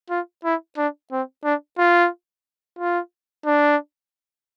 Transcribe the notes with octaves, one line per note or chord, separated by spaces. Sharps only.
F4
E4
D4
C4
D4
F4
F4
D4